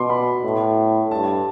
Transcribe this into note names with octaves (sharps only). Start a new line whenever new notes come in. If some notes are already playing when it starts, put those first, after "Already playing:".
Already playing: B2 C6 D6
B5
A2
G2 A5